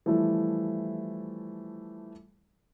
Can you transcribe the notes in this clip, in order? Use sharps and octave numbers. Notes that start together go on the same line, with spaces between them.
E3 F3 G3 A3 E4 F4